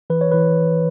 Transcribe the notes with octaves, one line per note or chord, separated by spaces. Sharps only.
E3 B4
C#5
E3 B4